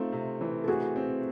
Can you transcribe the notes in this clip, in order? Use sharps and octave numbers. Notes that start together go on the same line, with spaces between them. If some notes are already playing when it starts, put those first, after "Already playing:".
Already playing: A3 C4 D#4 F4
C3
E3
A4
A3 F#4 G#4
C4